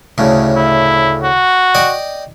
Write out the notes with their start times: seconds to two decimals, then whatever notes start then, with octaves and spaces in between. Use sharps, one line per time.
0.18 D2 A2 C#3
0.57 E4
1.23 F#4
1.75 D5 D#5 G5